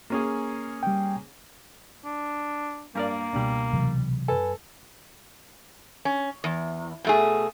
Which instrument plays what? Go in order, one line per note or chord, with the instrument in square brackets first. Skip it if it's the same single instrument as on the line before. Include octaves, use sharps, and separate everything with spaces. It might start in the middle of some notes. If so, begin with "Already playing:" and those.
[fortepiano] A#3 C#4 G#4
[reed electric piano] G3 G5
[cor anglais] D4
[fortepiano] G2 A#4 D5 [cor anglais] A#3
[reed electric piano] C#2 B2 [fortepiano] G3 D4
[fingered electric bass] C3 E3 F#3
[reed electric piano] F#2 B4 G#5 [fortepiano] A4
[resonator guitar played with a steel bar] C#4
E2
B2 A3 G#4